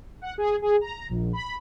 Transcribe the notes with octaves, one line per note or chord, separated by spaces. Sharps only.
F#5
G#4
G#4
A#5
A#1
B5